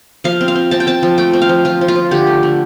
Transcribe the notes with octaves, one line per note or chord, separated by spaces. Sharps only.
F3 F5
C4
F5
C4
C4 A5
G5
C4 A5
F3
A3 G5
C4
F5
F3
F3 F4
F3
F4
F3
D3 G4
A3
D3